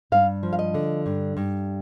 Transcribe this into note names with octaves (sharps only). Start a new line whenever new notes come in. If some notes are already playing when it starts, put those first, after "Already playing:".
G2 F5
F3
F5
D#5
D3
G2
G2